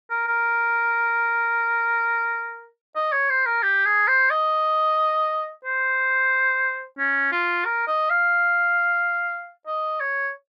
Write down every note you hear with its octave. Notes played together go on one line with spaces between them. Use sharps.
A#4
A#4
D#5
C#5
C5
A#4
G4
G#4
C5
D#5
C5
C#4
F4
A#4
D#5
F5
D#5
C#5